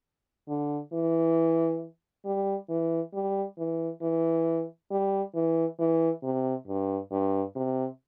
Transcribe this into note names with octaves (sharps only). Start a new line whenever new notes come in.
D3
E3
G3
E3
G3
E3
E3
G3
E3
E3
C3
G2
G2
C3